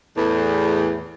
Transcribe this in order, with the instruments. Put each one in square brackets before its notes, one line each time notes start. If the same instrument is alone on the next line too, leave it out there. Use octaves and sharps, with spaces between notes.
[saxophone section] E2 A2